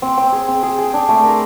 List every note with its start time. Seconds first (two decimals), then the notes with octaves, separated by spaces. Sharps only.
0.02 C4
0.17 C4
0.32 G#4
0.48 C4
0.63 G#4
0.78 G#4
0.94 D4
1.09 A3
1.24 A#4